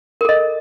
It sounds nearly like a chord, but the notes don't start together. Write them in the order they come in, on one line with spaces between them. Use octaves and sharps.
A#4 A4 D#5